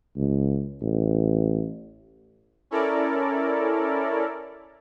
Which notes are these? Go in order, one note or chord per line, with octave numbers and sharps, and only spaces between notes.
C#2
A1
C#4 E4 A4 A#4 D5